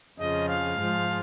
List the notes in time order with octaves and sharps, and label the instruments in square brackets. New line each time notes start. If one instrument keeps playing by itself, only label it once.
[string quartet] F2 C#3 F3 [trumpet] D#5
[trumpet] F5
[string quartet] G#2 F3 G#3